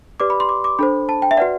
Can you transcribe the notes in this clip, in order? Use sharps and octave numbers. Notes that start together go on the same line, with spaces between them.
G4 B4 D5 D6
B5
C6
D6
D6
D4 A4 C5 B5
A5
G5
E5
F#4 B4 D5 F#5